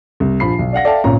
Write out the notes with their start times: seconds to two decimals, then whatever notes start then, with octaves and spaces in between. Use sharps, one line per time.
0.20 C2
0.40 A#1 F3 B5 C7
0.59 B1
0.73 D5 F5 F#5 A#6
0.84 A4 D5 E5 F5 G5 A5
1.04 G#1 C#2 A#2 C#5 A#5